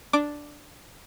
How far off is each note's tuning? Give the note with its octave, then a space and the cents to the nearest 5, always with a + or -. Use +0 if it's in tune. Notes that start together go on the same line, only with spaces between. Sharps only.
D4 +0 D6 +0